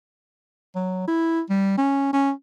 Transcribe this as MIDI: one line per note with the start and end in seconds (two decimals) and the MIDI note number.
0.76 1.03 54
1.08 1.41 64
1.50 1.76 55
1.78 2.12 61
2.13 2.31 61